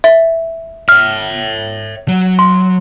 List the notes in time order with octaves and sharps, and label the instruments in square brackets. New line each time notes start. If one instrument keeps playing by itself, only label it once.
[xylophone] E5
[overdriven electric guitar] C#5 E5 [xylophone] F6
[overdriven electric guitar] F#3
[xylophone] C6